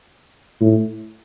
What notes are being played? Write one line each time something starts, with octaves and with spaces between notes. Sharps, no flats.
A2